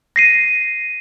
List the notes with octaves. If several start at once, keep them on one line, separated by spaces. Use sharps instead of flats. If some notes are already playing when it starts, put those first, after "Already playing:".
A#6 C7 D#7